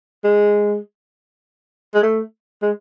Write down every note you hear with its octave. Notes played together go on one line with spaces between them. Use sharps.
G#3
G#3
A3
G#3